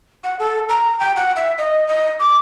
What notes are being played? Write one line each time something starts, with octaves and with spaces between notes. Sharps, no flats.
F#5
A4
A#5
G5
F#5
E5
D#5
D#5
D6